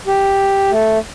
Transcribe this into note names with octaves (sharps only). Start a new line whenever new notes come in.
G4
A3